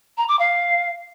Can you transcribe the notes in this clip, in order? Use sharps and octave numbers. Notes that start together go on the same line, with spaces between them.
A#5
D6
F5